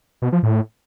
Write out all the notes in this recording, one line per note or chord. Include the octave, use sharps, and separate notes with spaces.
B2
F3
A2